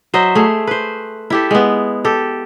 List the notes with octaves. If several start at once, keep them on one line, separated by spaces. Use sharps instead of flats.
F#3 C5 D#5 E5
A3 G#4
B4 C5
E4 G4 A4
G#3 B3
G4 A4